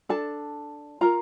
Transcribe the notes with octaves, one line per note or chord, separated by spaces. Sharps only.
D4 A4 A5
F4 A#4 A#5